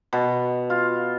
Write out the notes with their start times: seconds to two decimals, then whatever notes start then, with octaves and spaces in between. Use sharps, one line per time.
0.13 B2
0.70 F4